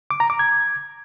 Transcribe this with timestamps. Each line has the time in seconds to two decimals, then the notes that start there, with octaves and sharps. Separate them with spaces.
0.11 D6
0.20 A#5
0.30 D6
0.39 G#6